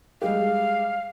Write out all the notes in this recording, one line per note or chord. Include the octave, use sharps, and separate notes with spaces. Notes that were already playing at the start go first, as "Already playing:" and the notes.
G3 G#3 G4 F5